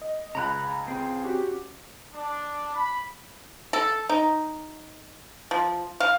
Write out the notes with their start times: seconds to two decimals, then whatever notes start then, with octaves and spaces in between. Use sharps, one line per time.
0.02 D#5
0.35 C#2 C#3 A#5 B5 F#6
0.88 C4 G#4
1.24 C#4 F#4 G4
2.14 D4
2.74 B5
3.73 A4
4.09 D#4
5.51 F3
6.00 F5